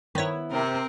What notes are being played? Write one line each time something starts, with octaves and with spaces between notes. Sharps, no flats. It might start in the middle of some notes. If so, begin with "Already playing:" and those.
D#3 B3 E4 C#5
C3 C4 A#4